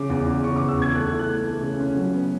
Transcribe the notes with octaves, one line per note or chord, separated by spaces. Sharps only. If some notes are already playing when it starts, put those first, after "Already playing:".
Already playing: C#3 D6
E2
E2
C#3 C#6
E2 D6
E6
E2 G#6
A3 F#6
E3
F#6
A3
A3
C#3
C#4
F#3
B3